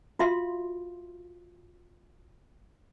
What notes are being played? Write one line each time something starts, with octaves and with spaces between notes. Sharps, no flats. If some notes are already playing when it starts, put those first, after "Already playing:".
F4 F#4 E5 F5 C6